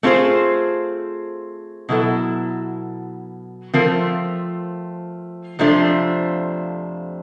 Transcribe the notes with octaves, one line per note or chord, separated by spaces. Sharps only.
A3 C4 F4 G#4 C5
B2 F#3 B3 E4 A4
F3 A3 C4 F4 A#4
F2 C3 F3 A3 D4